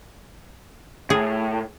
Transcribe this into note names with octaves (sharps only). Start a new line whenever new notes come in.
A2 G#4